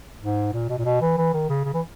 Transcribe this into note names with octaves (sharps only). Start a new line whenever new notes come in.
G#2
A#2
B2
A#2
B2
E3
E3
D#3
C#3
C#3
E3